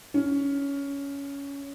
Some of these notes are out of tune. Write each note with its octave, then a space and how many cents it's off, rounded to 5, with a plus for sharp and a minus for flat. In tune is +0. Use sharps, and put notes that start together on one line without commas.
C#4 +15